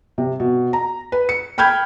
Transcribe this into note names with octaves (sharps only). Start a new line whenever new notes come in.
C3
B2
A#5
B4
C#7
G5 B5 F6 G6 G#6